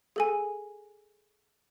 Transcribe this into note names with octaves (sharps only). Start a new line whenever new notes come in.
G#4 A4 G#5